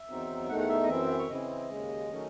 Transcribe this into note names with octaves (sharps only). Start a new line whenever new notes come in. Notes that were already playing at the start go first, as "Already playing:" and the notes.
Already playing: E5
E2 D#3 F#3 C4 D#4
E2 D#3 A3 D#4 F#5
F#5
E5
D#5
F#2 E3 C4 E5
C#5
C#3 E3 C4 E4 D#5
D#2 C#3 G#3
D#3 F#3 A3 C#4